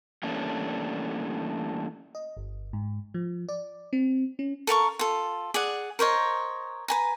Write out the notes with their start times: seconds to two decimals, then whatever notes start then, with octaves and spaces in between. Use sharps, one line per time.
0.23 E3 G3 A3 A#3 C#4 D4
2.15 D#5
2.37 G1
2.73 G#2
3.14 F3
3.49 D5
3.93 C4
4.39 C#4
4.67 A4 A#4 F5 C#6
4.99 F4 A4
5.54 G#4 D5 F#5
5.99 A#4 C5 C#5 D#5
6.88 B4 G#5 A#5